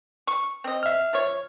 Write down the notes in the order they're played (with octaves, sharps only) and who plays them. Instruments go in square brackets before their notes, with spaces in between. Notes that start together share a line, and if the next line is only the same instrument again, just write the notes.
[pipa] C#6
C4 D#5
[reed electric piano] E5 F6
[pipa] F3 C#5